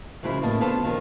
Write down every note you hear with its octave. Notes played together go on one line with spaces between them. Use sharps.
F#2 C#3 F3 G#3 E4
F#2 A2 A#3 B3 D#5 A5
D3 B3 F4 A4 C5 A5
A#2 D#3 F3